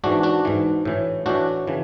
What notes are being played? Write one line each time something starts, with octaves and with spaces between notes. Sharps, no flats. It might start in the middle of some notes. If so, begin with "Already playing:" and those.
G#2 E3 D4 F#4
D4 F#4
G#2 E3
A2 E3
A2 E3 D4 F#4
C#3 E3